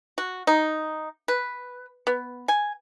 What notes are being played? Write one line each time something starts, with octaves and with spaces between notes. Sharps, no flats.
F#4
D#4
B4
B3
G#5